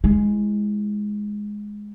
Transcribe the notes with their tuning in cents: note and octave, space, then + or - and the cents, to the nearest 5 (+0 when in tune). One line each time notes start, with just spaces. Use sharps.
G#3 +0 E4 +0